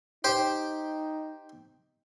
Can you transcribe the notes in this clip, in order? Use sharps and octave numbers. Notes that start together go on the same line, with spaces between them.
D#4 G4 C5